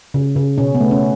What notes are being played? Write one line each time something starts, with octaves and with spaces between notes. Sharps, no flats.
C#3
C#3
B2 C#4
B3
A3
C#4